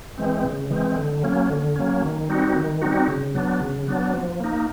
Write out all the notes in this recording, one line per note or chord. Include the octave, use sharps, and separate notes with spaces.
E3 G#3 C4
C#3
E3 G#3 C4
D3
F#3 A#3 C#4
D3
F#3 A#3 C#4
D#3
G3 C4 D#4 F#4
D#3
G3 C4 D#4 F#4
C#3
F#3 B3 D4
C#3
F#3 B3 D4
F3
A#3 D#4